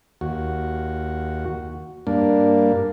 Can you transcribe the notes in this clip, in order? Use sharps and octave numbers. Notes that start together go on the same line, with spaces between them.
D#2 F#4
G2 A#3 D4